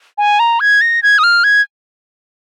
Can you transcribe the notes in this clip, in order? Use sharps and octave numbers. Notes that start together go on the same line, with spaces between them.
G#5
A#5
G#6
A#6
G#6
D#6
F6
G#6